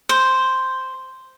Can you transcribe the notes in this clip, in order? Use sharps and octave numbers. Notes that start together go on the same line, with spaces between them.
C5